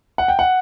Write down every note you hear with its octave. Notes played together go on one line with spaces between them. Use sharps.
F#5
G5
F#5